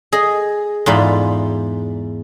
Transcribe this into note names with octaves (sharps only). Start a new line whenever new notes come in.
G#4 D#5
E2 G#2 F4 D5 B5